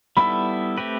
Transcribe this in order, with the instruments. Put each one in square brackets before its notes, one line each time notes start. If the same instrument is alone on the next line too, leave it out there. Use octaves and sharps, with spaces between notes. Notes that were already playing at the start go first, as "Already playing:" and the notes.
[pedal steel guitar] G3 B3 E4 A4 [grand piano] B5
[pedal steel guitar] A3 C4 G4 B4